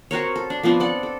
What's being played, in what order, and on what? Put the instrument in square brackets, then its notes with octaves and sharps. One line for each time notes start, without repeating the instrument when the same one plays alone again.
[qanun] C4 F#4 A#4 C#5
A4
D4
F3 B3 C4 D4
A4 D5 F#5
A4